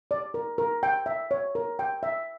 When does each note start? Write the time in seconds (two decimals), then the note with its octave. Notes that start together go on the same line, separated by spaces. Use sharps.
0.11 D5
0.34 A#4
0.58 A#4
0.83 G5
1.06 E5
1.31 C#5
1.55 A#4
1.79 G5
2.03 E5